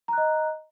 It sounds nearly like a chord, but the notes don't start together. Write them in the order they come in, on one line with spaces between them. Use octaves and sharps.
A#5 F#6 D#5